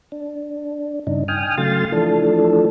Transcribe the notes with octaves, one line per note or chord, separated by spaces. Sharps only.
D4
G2 C#3 D4 D#4
G5 G#5 D#6 F6
C#3 F#3 A3 F5 C6 A6
E3 F3 A3 D4 A4